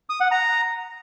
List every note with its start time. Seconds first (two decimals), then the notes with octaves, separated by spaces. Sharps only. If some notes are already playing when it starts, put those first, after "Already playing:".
0.10 D#6
0.20 F#5
0.31 A#5